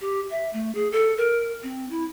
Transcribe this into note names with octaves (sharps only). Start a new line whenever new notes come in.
G4
E5
A3
G#4
A4
A#4
C4
E4